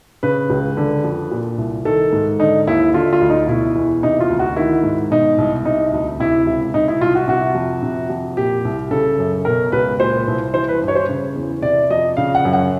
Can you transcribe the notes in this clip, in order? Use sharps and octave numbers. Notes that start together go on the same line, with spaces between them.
C#3 B4
C#2
D3
F2
A#2
C2
D#3 A4
G#2
D3 D#4
D#2 E4
D3 F4
F4
D2
D#4
B2 E4
E2
C3 D#4
F4
D2
F#4
D#3 E4
G#2
B2 D#4
C2
C3 D#4
D2
C3 E4
C#2
C3 D#4
E4
C2 F4
F#4
C3 F#4
F2
C3
F2
A#2 G4
C2
C#3 A4
F#2
B2 A#4
C#2 B4
A#2 C5
C2
E3 C5
B4
G2
C#5
C5
C#3
E2
C3 D5
F2 D#5
C#3 F5
F#5
F#2
F#5